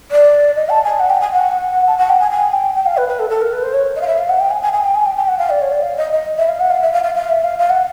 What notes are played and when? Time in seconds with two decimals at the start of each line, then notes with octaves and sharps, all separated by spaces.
0.11 D5
0.55 D#5
0.69 A5
0.84 G#5
0.99 F#5
1.09 G5
1.21 G#5
1.32 F#5
1.87 A5
1.98 F#5
2.09 G5
2.19 G#5
2.30 G#5
2.53 G5
2.75 G5
2.86 F5
2.97 B4
3.08 B4
3.19 A4
3.30 A4
3.41 A#4
3.52 B4
3.62 C5
3.73 C#5
3.96 D#5
4.01 F5
4.07 E5
4.17 F5
4.29 F#5
4.40 G5
4.50 G#5
4.62 G#5
4.72 G#5
4.84 G5
4.95 G#5
5.06 G5
5.17 G5
5.28 F#5
5.38 F5
5.50 D5
5.61 C#5
5.72 D5
5.82 F5
5.97 D#5
6.12 D#5
6.38 E5
6.48 F5
6.60 F#5
6.70 F5
6.82 E5
6.93 F5
7.03 F5
7.15 F5
7.29 E5
7.43 F5
7.58 F5
7.69 F#5